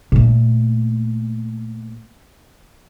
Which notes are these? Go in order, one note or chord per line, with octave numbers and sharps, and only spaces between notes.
A#2 A3